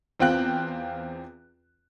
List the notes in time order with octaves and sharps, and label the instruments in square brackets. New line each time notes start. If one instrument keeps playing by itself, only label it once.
[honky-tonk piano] E2 C4 F4 G5 F#6